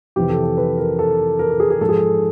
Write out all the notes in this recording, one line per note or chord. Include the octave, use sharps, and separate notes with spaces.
F2 C3 E3 G4
A4
A4
B4
A#4
A4
A#4
A4
G#4
G#4
G#2 F3 A4
G#4
A4